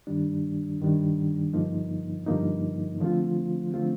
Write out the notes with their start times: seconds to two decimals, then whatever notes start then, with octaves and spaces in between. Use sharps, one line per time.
0.07 G2 D#3 G3 D4
0.80 G2 D#3 G3 D4
1.53 G2 D3 F3 A#3 D#4
2.26 G2 D3 F3 A#3 D#4
3.00 D3 F3 A3 C4 F4
3.74 D3 F3 A3 C4 F4